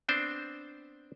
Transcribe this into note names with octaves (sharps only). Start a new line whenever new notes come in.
B3 C4 D4 C5